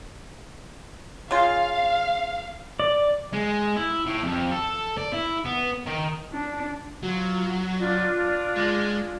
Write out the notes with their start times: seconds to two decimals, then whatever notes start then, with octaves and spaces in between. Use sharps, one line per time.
1.31 C#3 F4 F5
2.80 D5
3.33 G#3
3.76 E4
4.06 A2
4.23 F2
4.51 A4
4.97 D5
5.13 E4
5.45 B3
5.86 D#3
6.32 D4
7.03 F#3 F4
7.79 D4 F4
8.56 G#3